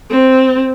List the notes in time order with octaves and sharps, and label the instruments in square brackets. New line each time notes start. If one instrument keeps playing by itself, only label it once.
[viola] C4